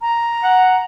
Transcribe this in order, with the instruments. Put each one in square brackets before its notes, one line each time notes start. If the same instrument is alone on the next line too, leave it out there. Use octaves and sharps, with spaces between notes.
[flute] A#5
[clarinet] F#5